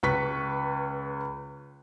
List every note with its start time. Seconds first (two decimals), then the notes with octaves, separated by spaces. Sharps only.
0.03 C#2 B4 C#6 B6